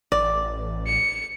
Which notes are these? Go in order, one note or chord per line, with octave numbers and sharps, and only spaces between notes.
A1 D5
C#7